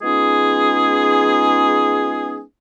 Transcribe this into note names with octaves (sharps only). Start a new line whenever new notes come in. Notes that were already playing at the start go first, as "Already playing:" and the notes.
G#3 B3 C#4 D#4 F4 G#4